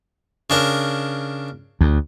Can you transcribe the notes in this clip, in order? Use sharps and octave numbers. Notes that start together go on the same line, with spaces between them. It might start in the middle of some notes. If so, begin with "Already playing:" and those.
C#3 D4 A#4
D2